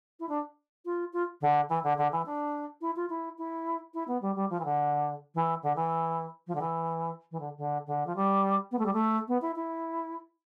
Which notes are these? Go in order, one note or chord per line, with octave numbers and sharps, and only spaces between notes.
E4
D4
F4
F4
D3
E3
D3
D3
E3
D4
E4
F4
E4
E4
E4
B3
G3
G3
F3
E3
D3
E3
D3
E3
F3
D3
E3
E3
D3
D3
D3
F3
G3
B3
A3
G3
A3
B3
E4
E4